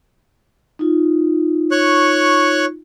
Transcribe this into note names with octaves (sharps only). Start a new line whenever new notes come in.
D#4 F4
C#5 C#6 F#6